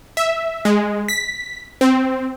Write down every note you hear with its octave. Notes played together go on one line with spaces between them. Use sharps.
E5
G#3
B6
C4